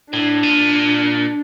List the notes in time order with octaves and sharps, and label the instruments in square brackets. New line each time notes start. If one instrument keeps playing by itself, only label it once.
[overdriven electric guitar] A2 [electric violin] D4
[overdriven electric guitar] A#2